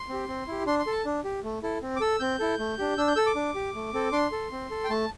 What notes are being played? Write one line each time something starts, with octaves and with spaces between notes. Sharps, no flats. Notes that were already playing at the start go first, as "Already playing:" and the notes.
Already playing: C6
C4 G4
C4
E4 G4
D4 C6
C6
A4
A5
D4
G4
A3
E4 A4
C4
D6
A4 E6
C4 G6
E4 A4
A3
D4 G4
D4 E6
G6
A4 E6
D6
D4
G4
A3
C4 A4
D4 C6
A4
C4
A4
G5
A3 A5